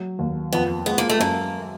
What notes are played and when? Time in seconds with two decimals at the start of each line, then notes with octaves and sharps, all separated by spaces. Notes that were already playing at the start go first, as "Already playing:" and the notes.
Already playing: F#3
0.19 D#2
0.53 F2 B3
0.86 G#3 B3
0.98 A#3
1.09 A3
1.20 F#2 A#3